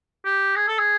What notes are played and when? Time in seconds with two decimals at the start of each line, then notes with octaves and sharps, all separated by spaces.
0.25 G4
0.56 G#4
0.68 A4
0.79 G#4